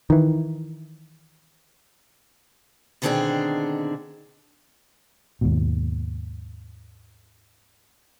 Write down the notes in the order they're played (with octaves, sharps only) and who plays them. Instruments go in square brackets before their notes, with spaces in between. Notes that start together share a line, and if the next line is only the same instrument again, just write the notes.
[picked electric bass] D#3 E3
[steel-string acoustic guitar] B2 D3 D#3 C4 D4 G#4
[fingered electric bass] D#2 G#2 B2